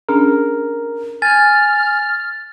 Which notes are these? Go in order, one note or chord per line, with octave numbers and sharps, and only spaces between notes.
C#4 D4 G#4 A#4
G#5 F6 A6